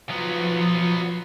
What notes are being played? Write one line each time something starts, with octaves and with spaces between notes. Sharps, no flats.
F3 F#3 B3